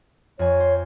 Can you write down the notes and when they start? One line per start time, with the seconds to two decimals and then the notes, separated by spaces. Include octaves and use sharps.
0.39 F2 C#5 G#5
0.60 C5